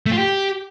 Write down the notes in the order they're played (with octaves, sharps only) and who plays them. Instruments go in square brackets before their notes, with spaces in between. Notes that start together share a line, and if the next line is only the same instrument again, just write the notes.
[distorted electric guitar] A3
F4
G4